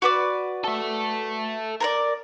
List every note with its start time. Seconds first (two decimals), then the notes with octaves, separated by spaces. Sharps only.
0.02 F#4 B4 D5
0.64 A4 E5
1.80 A#4 B4 D5